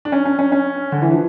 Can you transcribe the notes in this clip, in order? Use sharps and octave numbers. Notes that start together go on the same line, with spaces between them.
D4
C#4
C#4
C#4
C#4
D3
E3
F3